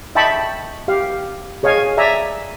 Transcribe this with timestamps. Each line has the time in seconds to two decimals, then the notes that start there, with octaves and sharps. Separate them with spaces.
0.15 D#5 E5 G5 A5 B5 C#6
0.88 G4 F5
1.63 G#4 C#5 D#5 F5 G#5
1.97 D5 E5 G#5 A#5